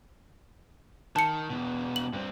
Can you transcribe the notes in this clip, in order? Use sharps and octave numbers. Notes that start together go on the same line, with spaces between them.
D#3 A5 C#7
E2 B2
F#7
G2 C4